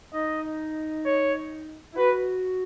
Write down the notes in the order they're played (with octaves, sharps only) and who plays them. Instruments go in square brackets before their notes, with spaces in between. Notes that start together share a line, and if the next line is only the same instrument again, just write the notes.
[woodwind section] D#4 [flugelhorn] D#5
[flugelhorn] C#5
[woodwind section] E4
[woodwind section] F#4 [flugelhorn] B4